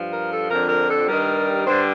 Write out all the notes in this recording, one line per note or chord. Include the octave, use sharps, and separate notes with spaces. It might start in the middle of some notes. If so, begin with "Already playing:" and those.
Already playing: G2 F3
A#4
A4
F2 D3 F3 A#4
A#4
A4
G2 D#3 G3 A#4
G2 D3 G3 C5